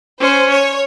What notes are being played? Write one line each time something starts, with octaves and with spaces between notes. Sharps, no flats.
C#4 C5
C#5